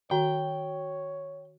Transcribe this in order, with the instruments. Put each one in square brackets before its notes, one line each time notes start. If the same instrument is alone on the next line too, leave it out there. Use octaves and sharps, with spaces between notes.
[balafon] D#3 [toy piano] F#4 [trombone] C#5 [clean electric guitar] G5